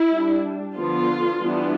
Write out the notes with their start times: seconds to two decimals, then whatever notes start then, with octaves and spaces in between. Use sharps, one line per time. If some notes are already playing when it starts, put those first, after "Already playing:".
Already playing: E4
0.11 G3 D4
0.75 D3 F3 B3 D4 F4
1.40 E3 G3 B3 D4